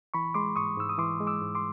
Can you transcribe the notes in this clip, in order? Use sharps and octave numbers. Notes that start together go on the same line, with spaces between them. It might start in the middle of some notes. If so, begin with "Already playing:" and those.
E3 B5 C#6
G#3 C6 D6
G#2 C#6 D#6
G#2 E6
D#6
E3 C6 D6
G#3
D6 E6
G#2
C6 D6